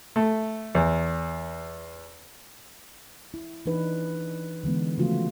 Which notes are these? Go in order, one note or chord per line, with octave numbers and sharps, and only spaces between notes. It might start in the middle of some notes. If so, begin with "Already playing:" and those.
A3
E2
E4
E3 D4 D#4 B4
D3 E3 G#3 B3
C#3 E3 F3 A3 F4 F#4